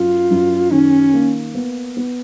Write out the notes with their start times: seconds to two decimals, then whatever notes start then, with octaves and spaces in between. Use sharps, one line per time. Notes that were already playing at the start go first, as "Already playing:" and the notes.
Already playing: F#2 F4
0.31 F#2
0.71 D#3 C#4
1.13 A#3
1.54 B3
1.97 B3